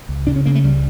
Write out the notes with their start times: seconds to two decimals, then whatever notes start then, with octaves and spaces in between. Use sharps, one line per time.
0.09 C#2
0.27 C#3 D4
0.36 C#4
0.46 C#3 A#3
0.55 A3
0.63 C#2 G3